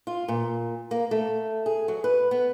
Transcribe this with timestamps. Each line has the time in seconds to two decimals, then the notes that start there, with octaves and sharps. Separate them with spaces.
0.07 F4
0.28 A#2
0.91 A#3
1.11 A3
1.66 G#4
1.88 F#3
2.04 B4
2.31 B3